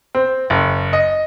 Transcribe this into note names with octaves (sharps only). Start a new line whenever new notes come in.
C4
F#1
D#5